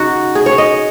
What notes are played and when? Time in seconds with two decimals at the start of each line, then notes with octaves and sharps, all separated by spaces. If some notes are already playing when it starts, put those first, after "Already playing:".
Already playing: C#3 D#4 F#4
0.35 G#4
0.46 C#5
0.58 D#5